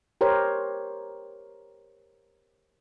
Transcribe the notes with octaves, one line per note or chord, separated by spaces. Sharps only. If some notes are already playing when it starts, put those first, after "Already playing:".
G4 A#4 C5 C#5